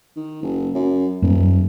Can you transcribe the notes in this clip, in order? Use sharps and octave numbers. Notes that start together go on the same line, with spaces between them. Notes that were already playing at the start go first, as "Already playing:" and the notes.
D#3
F#1
F#2
D#1 F#2